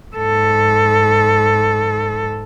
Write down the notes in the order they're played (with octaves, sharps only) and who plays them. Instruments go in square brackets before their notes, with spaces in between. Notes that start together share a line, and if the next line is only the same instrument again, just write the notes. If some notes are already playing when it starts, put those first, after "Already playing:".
[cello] G#2 A4